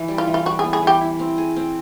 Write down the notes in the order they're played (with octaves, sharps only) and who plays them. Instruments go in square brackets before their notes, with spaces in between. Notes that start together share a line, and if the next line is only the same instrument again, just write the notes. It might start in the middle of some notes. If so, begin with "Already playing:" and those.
Already playing: [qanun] E3
G3
[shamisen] F4
[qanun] E3
[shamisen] F4
[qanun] G3 [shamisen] F#4
[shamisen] G#4
[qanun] B3
[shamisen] G#4
[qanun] E3 [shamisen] G4
[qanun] E4
C4
G#4
C4